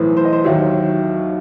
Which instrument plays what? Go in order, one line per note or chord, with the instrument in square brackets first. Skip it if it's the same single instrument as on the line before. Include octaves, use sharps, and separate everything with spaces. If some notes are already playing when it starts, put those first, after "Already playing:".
Already playing: [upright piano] B1 A2 E3 B4 C5
C5
D#5
C5
D#2 D#3 F#3 E5